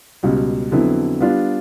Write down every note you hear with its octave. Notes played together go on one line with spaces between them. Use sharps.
C#2 B2 G3
F2 D3 F#3 B3 E4
G3 B3 D4 F4